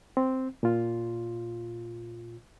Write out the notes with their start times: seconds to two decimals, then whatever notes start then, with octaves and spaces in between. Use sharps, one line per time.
0.17 C4
0.63 A#2 F4